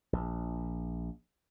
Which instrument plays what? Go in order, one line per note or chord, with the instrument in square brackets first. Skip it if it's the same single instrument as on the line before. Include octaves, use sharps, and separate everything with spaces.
[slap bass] A#1